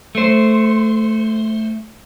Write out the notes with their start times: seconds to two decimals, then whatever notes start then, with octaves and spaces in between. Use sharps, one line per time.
0.15 A3 C5